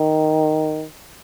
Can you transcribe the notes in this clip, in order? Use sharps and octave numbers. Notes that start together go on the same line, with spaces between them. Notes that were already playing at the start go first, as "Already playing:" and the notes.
Already playing: D#3